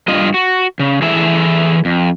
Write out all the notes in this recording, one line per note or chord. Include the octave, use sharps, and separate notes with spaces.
G2 F4 D#5
F#4
C#3
E3 E4 G#4 A4 E5
F2